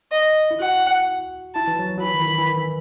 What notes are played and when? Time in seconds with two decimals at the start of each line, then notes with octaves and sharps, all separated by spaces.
0.12 D#5
0.51 E4
0.60 F#4 F#5
1.55 E4 A5
1.68 E3
1.79 F#3
1.98 F#3
2.02 E3 B5
2.14 D#3
2.22 E3
2.27 D#3
2.38 E3
2.48 D#3
2.58 E3